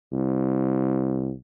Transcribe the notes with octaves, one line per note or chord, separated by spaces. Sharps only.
C2